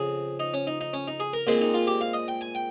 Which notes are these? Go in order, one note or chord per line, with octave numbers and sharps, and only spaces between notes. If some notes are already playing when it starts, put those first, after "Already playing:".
Already playing: F2 C#3 F3 G#4
D#4
C#4
D#4
D#4
C#4
D#4
G#4
A#4
A#2 G#3 C4 C5
D#4
F4
G4
F5
D#5
G5
G#5
G5